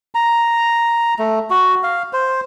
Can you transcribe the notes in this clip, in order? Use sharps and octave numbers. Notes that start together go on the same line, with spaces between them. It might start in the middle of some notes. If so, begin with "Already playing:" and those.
A#5
A3
F#4
F5
C5